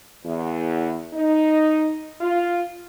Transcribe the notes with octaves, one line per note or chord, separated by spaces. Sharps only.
E2
D#4
F4